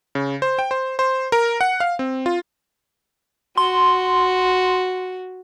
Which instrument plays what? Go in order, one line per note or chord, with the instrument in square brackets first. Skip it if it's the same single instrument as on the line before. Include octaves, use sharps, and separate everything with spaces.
[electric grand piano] C#3
C5
G5
C5
C5
A#4
F#5
F5
C4
F4
[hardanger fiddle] F#4 [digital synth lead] C6